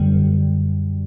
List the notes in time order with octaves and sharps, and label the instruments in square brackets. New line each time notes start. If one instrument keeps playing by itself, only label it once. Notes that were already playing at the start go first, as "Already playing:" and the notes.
Already playing: [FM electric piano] F#2 D3 G3